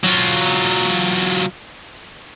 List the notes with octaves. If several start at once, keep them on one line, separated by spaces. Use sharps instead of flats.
F#3 F4